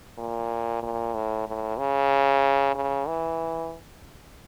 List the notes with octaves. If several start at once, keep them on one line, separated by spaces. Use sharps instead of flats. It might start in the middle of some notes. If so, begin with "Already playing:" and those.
A#2
A#2
A2
A2
C#3
C#3
E3